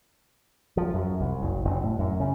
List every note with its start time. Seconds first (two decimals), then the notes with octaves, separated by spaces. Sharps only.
0.77 F3
0.94 F#2
1.20 C2
1.42 F#1
1.65 F#1
1.84 A2
1.99 F#2
2.20 C#3